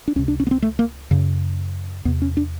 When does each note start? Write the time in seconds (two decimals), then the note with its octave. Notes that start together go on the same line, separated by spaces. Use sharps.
0.08 D4
0.15 C#2 C#4
0.19 C3
0.28 D4
0.40 C#4
0.47 B3
0.51 C4
0.62 A3
0.79 A#3
1.11 F#2 C#3
2.05 E2 C3 B3
2.22 C#4
2.37 D4